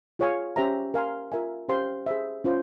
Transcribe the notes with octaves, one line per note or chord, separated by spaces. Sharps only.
F4 G#4 C#5 F5 G#5
C#4 G4 C5 E5 A#5
A#4 F5 G#5 C6
F4 A#4 E5 G#5
C#4 G4 C5 F5 C6
G#4 C5 E5
C#4 F4 C5